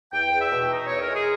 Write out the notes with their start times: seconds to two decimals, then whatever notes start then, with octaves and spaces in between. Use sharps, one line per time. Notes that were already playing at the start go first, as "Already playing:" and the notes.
0.13 E2 G5
0.32 E2
0.41 E5
0.51 B2
0.71 D#4
0.86 E2 C#5
1.01 A#4
1.11 G#3 G#4